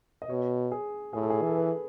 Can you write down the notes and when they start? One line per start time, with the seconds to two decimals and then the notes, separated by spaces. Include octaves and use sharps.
0.22 D#5
0.30 B2 C#5
0.72 G#4
1.13 A2 G#4
1.22 A4
1.30 G#4
1.42 E3
1.47 A4
1.56 B4